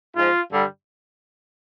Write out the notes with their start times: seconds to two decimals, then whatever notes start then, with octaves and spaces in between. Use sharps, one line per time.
0.16 G#2 F3 F4
0.51 G2 D3 G3